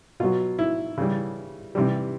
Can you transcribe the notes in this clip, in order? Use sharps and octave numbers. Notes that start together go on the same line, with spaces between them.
B2 F#3 F4
E4
C#3 E3 G3
C3 E3 G3